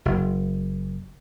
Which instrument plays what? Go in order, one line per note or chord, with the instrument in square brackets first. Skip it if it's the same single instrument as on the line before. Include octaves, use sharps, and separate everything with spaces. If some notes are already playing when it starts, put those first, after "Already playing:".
[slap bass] F#1